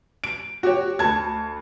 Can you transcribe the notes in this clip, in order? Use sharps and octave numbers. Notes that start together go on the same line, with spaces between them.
D7
F#4 G4 C#5
D2 A5 G#6